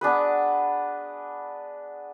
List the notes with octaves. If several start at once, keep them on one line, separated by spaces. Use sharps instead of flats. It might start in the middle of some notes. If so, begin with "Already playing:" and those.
B3 D4 G#4 B4